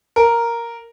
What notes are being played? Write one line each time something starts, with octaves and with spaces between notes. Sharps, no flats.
A#4